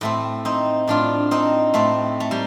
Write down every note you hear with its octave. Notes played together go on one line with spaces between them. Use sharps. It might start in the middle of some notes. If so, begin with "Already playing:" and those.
A2 A3 C4
C4 D#4
A2 D4 F4
C4 D#4
A2 A3 C4
A3
G3 A#3